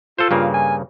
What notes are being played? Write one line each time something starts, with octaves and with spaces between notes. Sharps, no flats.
F4 A4 C5
G2 C#3 A#3
G#5